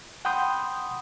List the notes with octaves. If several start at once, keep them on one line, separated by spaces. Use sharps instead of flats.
F#5 G5 B5 C6 D#6 G6